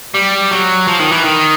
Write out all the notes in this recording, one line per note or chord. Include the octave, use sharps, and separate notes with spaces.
G3
F#3
F3
D#3
E3
D#3